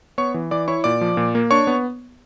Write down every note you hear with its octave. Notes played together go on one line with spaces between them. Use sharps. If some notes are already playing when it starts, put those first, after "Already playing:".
B3 C#5 C#6
E3
E3 D5 D6
E4 C#5 C#6
A#2 D5 D6
F3
A#2
A#3
D4 C#5 C#6
B3